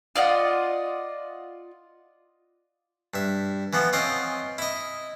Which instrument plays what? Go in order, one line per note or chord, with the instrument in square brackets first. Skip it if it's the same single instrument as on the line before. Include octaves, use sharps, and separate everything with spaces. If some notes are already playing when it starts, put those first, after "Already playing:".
[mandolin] F4 D5 D#5 F#5
[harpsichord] G2 E5
E3 F3 B3
C4 C#4 F4 D#5 C6
E4 D#5